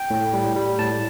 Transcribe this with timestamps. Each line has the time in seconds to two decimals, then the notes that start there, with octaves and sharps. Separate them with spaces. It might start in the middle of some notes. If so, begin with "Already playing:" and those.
Already playing: G5
0.10 A2
0.33 G3
0.56 G3
0.79 A2 A5